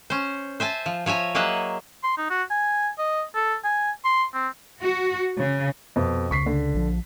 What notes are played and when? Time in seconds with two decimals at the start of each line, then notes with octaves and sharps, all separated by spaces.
0.10 C#4 C5
0.60 C5 E5 G#5 A5
0.86 F3
1.06 F3 C#5 E5 G#5 A#5
1.35 F#3 A#3 G#4 D#5 E5 F#5
2.03 C6
2.18 D#4
2.30 F#4
2.50 G#5
2.98 D#5
3.34 A4
3.64 G#5
4.05 C6
4.34 C4
4.80 F#4
5.38 C#3
5.96 F2 B2
6.31 C#2 C#3 C#6 B6 C7
6.46 D3
6.74 A#1 F3